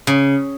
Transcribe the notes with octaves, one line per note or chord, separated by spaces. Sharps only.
C#3